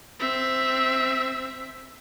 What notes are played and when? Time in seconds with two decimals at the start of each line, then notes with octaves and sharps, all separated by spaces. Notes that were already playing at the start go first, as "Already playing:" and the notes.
0.20 C4 E5